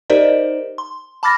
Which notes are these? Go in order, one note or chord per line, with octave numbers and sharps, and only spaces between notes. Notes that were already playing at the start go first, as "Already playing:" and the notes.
D#4 G4 A#4 C5 D5 D#5
C6
A5 B5 D6 F6 A6 A#6